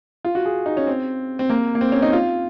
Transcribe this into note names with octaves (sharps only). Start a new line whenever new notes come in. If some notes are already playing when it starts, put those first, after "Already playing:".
F4
F#4
G#4
D#4
C#4
C4
C4
A#3
A#3
C4
C#4
D#4
F4